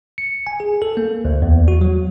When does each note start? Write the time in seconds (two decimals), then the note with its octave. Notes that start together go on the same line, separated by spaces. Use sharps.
0.18 C#7
0.47 G#5
0.60 G#4
0.82 A4
0.97 A#3
1.25 D2
1.42 E2
1.68 F#4
1.81 F#3